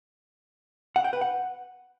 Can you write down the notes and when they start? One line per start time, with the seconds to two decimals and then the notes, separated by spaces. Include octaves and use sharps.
0.96 F#5
1.04 G5
1.13 B4
1.21 F#5